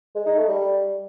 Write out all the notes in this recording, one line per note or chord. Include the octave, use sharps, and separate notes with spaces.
G#3
D#4
A3
G3